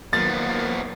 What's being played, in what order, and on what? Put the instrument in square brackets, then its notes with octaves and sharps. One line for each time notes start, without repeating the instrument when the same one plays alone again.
[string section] D#3 F#3 [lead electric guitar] F3 B3 [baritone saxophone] A#3 [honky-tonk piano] A6